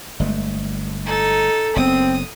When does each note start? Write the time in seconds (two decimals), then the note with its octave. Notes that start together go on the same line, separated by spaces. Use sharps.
0.20 G1 G#3 A3
1.05 D#4 A4
1.76 F#1 B3 C4 D#6